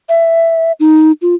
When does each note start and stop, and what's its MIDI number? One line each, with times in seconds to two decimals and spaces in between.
0.09 0.72 76
0.80 1.12 63
1.22 1.35 65